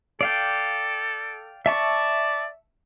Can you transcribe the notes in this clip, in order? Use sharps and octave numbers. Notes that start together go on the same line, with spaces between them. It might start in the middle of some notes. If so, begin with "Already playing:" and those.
A4 D5 F5 G5
D5 E5 A5 C#6